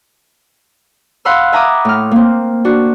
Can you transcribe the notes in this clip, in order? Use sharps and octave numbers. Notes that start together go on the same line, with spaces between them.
F5 F#5 B5 C6 E6 F6
E5 G#5 A#5 B5 D6 D#6
A2 F6
A#3 C4
D4 F#4